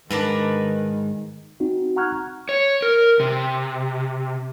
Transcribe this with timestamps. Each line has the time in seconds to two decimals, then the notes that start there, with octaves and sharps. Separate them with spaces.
0.11 G#2 D#3 D4 A#4 B4
1.60 C4 D#4 F#4
1.96 F#5 A#5 C#6 F6 F#6 G#6
2.49 C#5
2.82 A#4
3.20 C3